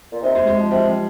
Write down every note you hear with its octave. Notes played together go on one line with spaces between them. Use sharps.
A#2
C3 D#4
G#3
G#3
F3
C3 G3
G3